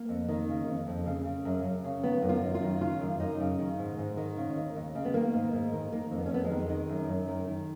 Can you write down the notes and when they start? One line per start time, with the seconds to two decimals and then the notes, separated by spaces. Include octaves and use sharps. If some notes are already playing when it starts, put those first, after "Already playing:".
Already playing: A#3
0.09 F2
0.29 D#3
0.48 C#3
0.67 F2
0.87 F2
1.06 C#3
1.25 C#3
1.45 F#2
1.64 F#2
1.84 C#3
2.03 D#3 B3
2.22 F#2
2.29 F4
2.42 F#2
2.55 F4
2.62 D#3
2.81 C#3 F4
3.00 F#2
3.19 F#2 D#4
3.40 C#3
3.58 D#3
3.78 G#2
3.98 G#2
4.17 D#3
4.36 C#3
4.56 D#2
4.75 D#2
4.95 C#3
5.05 B3
5.14 D#3 A#3
5.34 G#2
5.53 G#2
5.73 D#3
5.91 D#3 A#3
6.11 F2
6.18 B3
6.26 C#4
6.31 F2 B3
6.44 G#3
6.50 D#3
6.70 D#3
6.89 F#2
7.09 F#2
7.28 D#3
7.47 D#3